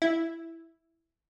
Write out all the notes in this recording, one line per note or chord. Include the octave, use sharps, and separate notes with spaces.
E4